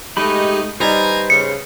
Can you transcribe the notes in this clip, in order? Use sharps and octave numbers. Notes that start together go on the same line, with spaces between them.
G#3 A3 D#4 G4 B5
G3 D#4 B4 C5 G#5 A#5
C#3 C#7